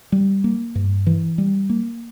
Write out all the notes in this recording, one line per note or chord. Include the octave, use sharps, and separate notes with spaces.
G3
A#3
G2
E3
G3
A#3